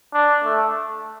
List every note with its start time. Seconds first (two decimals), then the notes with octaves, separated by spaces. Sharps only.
0.14 D4
0.45 A3